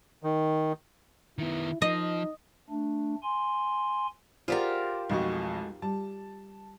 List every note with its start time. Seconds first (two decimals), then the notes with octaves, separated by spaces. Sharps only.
0.23 D#3
1.38 D#3 B3 E4
1.82 F3 D#4 D#5
2.69 A3 D4
3.23 G#5 C6
4.48 F4 G4 G#4 A#4 C5 D5 F#5
5.09 B1 F2 G#3 A3 F#4 C#6
5.82 G3 A5